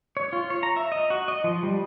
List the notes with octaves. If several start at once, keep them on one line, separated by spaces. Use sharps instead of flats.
C#5
F4
C#5
A#5
E5
D#5
F#4
D#5
F3
G3